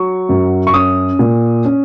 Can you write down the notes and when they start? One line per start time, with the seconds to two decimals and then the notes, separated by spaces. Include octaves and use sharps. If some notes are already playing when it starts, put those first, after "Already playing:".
Already playing: F#3 C#6
0.29 F#2
0.67 C#6
0.73 C#4 D#6
1.19 A#2
1.65 C#4